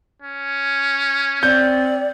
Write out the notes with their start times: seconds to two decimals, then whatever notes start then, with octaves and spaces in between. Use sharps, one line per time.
0.22 C#4
1.43 C4 D5 G6